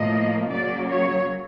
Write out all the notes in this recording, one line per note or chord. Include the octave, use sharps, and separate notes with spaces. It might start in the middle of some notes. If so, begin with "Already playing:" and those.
Already playing: A2 F3 A#3 D#5
C#3 F#3 A#3 D5
C#5